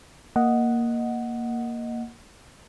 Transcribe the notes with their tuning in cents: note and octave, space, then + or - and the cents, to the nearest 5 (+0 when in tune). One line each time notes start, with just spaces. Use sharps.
A#3 +0 D#5 +0 F#5 +0